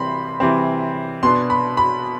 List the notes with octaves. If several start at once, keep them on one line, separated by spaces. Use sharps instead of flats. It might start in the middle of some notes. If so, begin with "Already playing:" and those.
Already playing: C3 E3 G3 C4 B5 C6
C3 E3 G3 C4
B2 B3 D4 C6
B5
B5